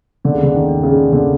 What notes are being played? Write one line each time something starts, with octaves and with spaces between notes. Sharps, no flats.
D3 A#3
C#3
D3
D#3
A#3
C#3
D3 A#3